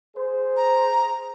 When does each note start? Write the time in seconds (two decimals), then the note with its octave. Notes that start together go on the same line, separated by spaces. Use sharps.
0.16 G#4 C5
0.57 A#5